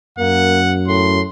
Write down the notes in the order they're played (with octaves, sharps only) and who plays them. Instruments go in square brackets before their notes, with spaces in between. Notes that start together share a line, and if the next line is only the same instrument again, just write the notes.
[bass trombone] F#2 [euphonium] A#3 [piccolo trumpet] F#5
[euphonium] A2 [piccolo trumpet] C6